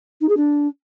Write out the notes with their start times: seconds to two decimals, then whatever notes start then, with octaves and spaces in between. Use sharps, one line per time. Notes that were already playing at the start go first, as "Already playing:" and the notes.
0.21 D#4
0.29 G#4
0.37 D4